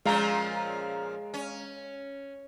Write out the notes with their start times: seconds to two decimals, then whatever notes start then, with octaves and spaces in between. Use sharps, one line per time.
0.05 A#2 F3 G#3 C#4 F5 A#5
1.34 C#4